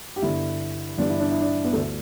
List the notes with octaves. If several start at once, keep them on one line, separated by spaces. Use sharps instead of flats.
G4
G1 G2 D3 E4
G1 G2 E3 D4
E4
D4
E4
D4
B3
D2 D3 A3